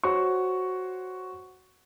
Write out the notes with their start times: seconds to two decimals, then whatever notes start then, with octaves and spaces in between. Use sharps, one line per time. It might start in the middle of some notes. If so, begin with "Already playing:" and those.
0.04 F#4 C5 C#5 C#6